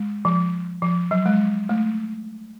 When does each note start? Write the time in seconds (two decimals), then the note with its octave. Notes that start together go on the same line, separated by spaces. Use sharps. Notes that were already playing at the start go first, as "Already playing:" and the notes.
Already playing: G#3
0.25 F3
0.82 F3
1.11 F#3
1.26 G#3
1.69 A3